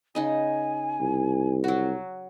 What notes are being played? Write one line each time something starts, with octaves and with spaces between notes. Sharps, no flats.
C#3 D#4 D#5 G#5
C2
F#3 F#4